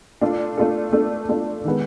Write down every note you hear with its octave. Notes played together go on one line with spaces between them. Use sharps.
A3 D4 F4 A4
A3 D4 F4 A4
A3 D4 F4 A4
A3 D4 F4 A4
D#3 G#3 B3